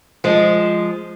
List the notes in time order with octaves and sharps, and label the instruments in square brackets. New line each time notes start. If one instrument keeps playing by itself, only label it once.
[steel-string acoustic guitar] F3 G#3